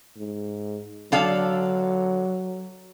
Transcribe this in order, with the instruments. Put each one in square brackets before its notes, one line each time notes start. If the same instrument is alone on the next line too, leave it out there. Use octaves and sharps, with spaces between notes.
[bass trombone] G#2
[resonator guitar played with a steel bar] D3 A4 F5 [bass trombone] F#3